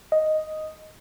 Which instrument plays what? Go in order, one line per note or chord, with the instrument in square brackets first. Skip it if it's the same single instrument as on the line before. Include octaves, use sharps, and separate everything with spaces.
[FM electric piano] D#5